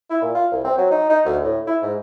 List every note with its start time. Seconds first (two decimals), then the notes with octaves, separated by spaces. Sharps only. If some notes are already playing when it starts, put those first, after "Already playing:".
0.10 E4
0.22 A#2
0.35 F4
0.52 C2
0.64 C4
0.77 F#3
0.91 D#4
1.10 D#4
1.25 D2
1.44 A2
1.67 E4
1.82 G#2